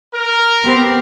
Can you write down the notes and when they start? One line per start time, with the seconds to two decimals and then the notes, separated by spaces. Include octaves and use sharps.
0.14 A#4
0.64 B3 C4 G4